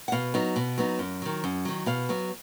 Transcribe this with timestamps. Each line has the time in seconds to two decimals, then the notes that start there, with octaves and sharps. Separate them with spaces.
0.08 F#5
0.12 B2 F5
0.34 F#3 B3 D#4
0.56 B2
0.78 F#3 B3 D#4
0.99 F#2
1.22 D#3 F#3
1.44 F#2
1.65 D#3 F#3
1.86 B2 F5
2.09 F#3 B3